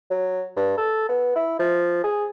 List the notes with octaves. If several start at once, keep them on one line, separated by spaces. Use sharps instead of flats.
F#3
G2
A4
B3
E4
F3
G#4